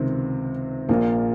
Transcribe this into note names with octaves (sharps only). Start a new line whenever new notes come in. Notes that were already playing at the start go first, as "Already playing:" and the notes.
Already playing: C#2 C3 D#3 C4
A#1 A#2 A#3